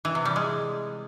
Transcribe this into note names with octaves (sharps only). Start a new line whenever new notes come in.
E3
C3
G3
G#3